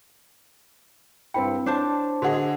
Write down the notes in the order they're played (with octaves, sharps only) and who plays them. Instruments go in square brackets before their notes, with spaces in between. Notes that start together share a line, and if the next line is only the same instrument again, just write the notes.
[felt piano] G2 C4 B5 [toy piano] E4 G5
[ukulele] D4 C5 A5 [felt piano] C#5
[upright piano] D3 G#4 D#5 [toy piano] F#4 A#4 F#5